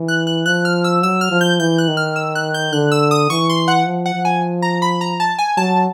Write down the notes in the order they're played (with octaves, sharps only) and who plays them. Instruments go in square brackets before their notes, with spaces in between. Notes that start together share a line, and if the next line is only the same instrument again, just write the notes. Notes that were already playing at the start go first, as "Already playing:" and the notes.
Already playing: [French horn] E3
[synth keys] F#6
F#6
[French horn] F3 [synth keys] F#6
[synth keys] F6
E6
[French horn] F#3 [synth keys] E6
[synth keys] F6
[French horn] F3
[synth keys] G6
[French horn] E3 [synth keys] G6
[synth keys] F#6
[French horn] D#3
[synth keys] F6
E6
F#6
G6
[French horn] D3 [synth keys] F#6
[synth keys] E6
D#6
[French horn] E3 [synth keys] C#6
[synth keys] C6
F#5
[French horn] F3
[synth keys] F#5
[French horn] F3
[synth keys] G#5
A#5
B5
A#5
A5
G#5
[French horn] F#3 [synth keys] A5